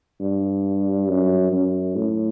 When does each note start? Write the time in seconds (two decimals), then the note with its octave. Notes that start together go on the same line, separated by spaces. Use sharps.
0.20 G2
1.09 F#2
1.52 F#2
1.96 A2